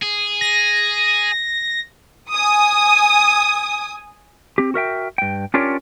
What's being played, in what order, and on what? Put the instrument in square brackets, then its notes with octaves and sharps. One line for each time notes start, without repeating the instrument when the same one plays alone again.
[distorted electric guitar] G#4
[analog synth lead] A#6
[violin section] G#5 D#6
[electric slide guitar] C4 G4
F#4 A#4 E5 G5
G2 G5
C#4 D4 F4 G4 A#4 C#5